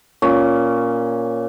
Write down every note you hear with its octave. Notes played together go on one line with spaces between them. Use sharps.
A#2 C#4